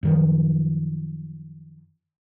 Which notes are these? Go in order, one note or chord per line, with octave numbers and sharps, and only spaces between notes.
F#2 D#3 F3